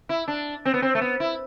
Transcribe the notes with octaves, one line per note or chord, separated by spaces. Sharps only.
E4
D4
C4
B3
C4
A3
B3
E4